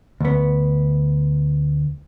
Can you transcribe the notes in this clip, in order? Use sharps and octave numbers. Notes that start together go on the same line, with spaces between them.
D2 B3